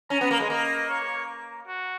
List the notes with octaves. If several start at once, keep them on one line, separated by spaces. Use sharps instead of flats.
C#4 A#5
B3
A#3
G#3
A#3 D#5
C#5
F#4